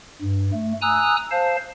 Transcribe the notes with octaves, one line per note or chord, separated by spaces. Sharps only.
G2
A3
G#5 A#5 D#6 E6 F#6
C5 F5 A5